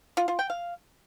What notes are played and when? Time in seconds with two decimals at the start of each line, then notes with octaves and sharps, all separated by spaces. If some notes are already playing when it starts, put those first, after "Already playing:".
0.17 F4
0.28 F4
0.39 G5
0.50 F5